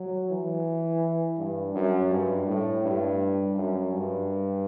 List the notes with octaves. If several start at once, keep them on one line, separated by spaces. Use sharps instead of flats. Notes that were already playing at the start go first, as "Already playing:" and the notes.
Already playing: F#3
E3
G2
F#2
G2
A2
G2
F#2
G2